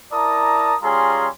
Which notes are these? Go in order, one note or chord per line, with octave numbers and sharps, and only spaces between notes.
E4 A#4 D5 A5 A#5 D#6
G3 C#4 F4 G#4 A#5 C6